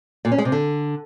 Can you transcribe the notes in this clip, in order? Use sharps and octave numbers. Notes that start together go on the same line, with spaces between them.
A#2
C#4
G#3
C3
D3